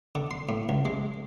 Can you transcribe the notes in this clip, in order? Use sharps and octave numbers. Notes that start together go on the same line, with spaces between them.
D3
C6
A2
C#2
G#3